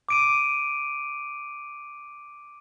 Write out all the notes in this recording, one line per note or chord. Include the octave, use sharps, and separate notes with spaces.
D6 D7 D#7